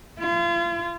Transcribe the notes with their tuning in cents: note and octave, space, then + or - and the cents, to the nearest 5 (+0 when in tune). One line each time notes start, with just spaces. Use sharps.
F4 -35